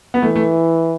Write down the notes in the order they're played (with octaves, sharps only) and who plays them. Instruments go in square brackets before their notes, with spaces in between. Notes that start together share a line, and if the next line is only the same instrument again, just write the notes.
[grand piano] B3
[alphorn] E3 [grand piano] A3
[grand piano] A3